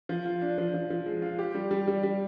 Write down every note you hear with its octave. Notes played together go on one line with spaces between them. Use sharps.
F3
F4
D4
F3
F3
F3
G#3
F4
G4
G3
G3
G3
G3